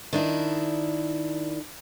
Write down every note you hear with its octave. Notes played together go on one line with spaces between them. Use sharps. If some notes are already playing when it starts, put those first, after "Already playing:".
D#3 D4 E4